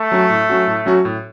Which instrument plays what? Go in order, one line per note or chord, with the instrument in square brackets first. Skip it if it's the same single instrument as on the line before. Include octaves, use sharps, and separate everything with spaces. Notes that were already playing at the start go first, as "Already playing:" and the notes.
Already playing: [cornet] A3
[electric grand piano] F#3 C#4 F#4
A2
F#3 C#4 F#4
A2
F#3 C#4 F#4
A2